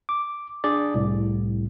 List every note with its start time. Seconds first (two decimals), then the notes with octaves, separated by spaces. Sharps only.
0.09 D6
0.64 D4 G#4 D5
0.94 C2 A2